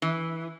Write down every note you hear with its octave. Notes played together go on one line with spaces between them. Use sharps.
E3